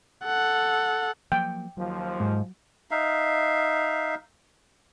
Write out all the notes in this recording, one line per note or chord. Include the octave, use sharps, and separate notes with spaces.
A4 F#5
F3 F#3 A#3 G5
D#2 F3 F#3
G#2
D#4 E5 F5